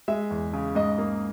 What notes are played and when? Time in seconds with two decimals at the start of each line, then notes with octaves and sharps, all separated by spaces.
0.08 G#3 E5
0.30 E2
0.53 C#3
0.75 G#2 D#5
0.98 A#3